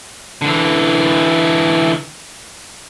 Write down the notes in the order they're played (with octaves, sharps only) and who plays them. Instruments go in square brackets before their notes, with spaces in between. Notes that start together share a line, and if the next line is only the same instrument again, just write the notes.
[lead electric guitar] D3 E3